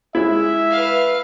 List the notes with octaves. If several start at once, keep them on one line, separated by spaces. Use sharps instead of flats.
G#3 E4 E5
B4 F5